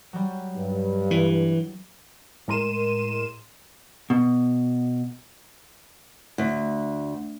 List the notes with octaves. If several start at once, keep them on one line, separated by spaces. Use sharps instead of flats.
F#3 G3
G2
E3
A2 G#3 A#4 C6 D#7 E7
B2
D2